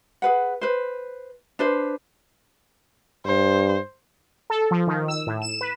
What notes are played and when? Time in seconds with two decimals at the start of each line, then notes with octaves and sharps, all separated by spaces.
0.22 G#4 B4 F#5
0.61 B4 C5
1.59 D4 B4 C5
3.26 G2 C5
4.50 A4
4.71 F3
4.87 D#3
5.08 E6
5.27 A2
5.42 E7
5.61 B4